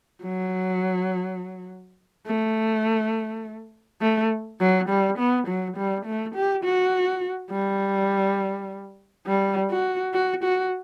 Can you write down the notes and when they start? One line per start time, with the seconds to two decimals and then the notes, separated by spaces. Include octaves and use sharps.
0.23 F#3
2.26 A3
4.01 A3
4.60 F#3
4.89 G3
5.18 B3
5.48 F#3
5.77 G3
6.06 A3
6.35 G4
6.64 F#4
7.51 G3
9.27 G3
9.71 F#4
10.14 F#4
10.44 F#4